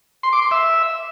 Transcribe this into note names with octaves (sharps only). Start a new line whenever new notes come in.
C6
D6
C6
E5